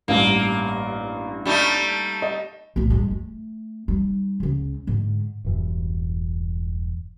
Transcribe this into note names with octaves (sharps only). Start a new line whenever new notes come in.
A1 G2 A#3
G3 A3 D#4
D#5
B1 A2
G2 G#3
A3
G3 D#4
C#2 C#3
G#2 D3
E1 G2 E3